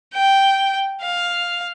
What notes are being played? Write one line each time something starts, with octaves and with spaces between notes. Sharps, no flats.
G5
F5